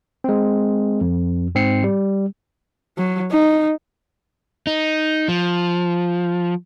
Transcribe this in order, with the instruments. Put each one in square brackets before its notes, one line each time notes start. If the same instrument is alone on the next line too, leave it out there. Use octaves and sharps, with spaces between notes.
[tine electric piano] G#3 C4
F2
G#2 C4 C7 C#7
G3
[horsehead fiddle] F#3
D#4
[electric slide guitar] D#4
F3